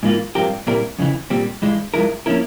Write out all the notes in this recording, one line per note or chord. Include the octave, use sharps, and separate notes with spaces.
G#2 E3 A#3 F4
G2 F3 C4 G4 A#4
A#2 G3 C4 E4 A#4
F2 C#3 E3
A#2 G3 C4
G2 E3 G#3
G2 F3 G#3 E4 A#4
F3 A#3 C#4 E4 A#4